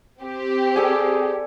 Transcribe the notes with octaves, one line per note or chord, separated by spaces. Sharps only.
C4 G4
G#4 A4 D5 G#5